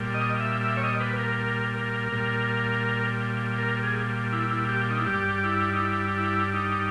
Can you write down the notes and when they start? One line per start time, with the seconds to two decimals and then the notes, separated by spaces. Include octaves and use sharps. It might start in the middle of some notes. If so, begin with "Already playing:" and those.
Already playing: A#2 G3
0.14 D#5
0.40 E5
0.64 E5
0.77 C#5
0.83 D#5
1.00 B4
1.19 A#4
1.38 A#4
1.74 A#4
2.12 A#2 G3
3.58 A#4
3.83 G#4
4.32 E4
4.51 E4
4.69 G4
4.90 D#4
4.99 E4
5.06 G2 G3 G4
5.38 G4
5.44 E4
5.73 D#4
5.80 E4
6.17 E4
6.53 D#4